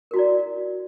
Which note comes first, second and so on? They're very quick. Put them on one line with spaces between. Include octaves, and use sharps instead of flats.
A#4 F#4 E4 D5